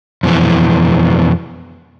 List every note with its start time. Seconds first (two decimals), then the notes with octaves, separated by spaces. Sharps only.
0.23 F2 B2 E3